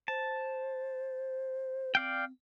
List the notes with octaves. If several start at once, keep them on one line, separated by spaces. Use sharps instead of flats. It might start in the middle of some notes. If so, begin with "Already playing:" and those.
C5 A5
C4 D5 F5 G5